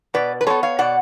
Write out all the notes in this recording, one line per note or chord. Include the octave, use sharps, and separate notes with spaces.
B2 B4 D5
B4
G#3 B3 A4 C#5
C#5 F5
B2 D5 F#5